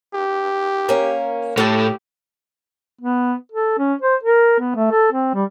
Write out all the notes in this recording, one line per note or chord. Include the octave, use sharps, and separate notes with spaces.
G4
A#3 C#4
A2 G4 A4 A5
B3
A4
C#4
C5
A#4
B3
A3
A4
C4
G3